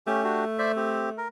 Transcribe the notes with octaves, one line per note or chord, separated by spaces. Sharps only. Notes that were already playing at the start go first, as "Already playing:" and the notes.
A3 C#4 G4
D4 F#4 G4
C5 D5 E5
C4 G4
A#4